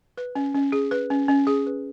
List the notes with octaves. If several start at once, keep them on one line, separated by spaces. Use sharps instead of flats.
B4
C#4
C#4
G#4
B4
C#4
C#4
G#4
B4